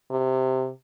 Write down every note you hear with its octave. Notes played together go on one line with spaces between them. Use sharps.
C3